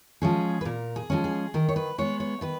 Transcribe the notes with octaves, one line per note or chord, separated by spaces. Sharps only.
F3 G#3 C#4 G#4
B4
A#2 A#4
G#4
F3 G#3 C#4
G#4
D#3 A#4
C#5
B4
G#3 B3 C#5
C#5
D#3 B4